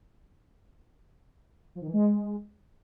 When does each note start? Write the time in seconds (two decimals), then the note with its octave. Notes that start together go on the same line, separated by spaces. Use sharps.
1.75 F3
1.81 D#3
1.87 E3
1.93 G#3